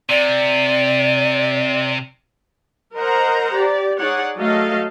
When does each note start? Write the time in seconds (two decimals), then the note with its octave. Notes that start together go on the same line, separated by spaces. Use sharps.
0.09 C3 D5
2.95 A#4 C5 D#5 F#5 A#5
3.54 G4 D5
3.97 D#4 G#4 C#5 D5 F#5
4.36 F#3 A3 A4 D#5 F5